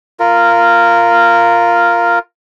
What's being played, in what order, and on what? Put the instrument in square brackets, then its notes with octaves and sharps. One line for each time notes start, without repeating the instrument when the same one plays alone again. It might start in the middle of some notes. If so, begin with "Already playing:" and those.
[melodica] F4 A#4